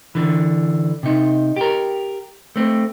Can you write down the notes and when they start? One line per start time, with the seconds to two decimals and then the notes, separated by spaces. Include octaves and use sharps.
0.15 D3 E3
1.03 C3 D#4
1.56 G4 A#4
2.56 A3 C4